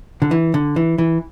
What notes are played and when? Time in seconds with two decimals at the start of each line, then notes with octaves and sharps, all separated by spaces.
0.22 D3
0.31 E3
0.54 D3
0.76 E3
0.98 E3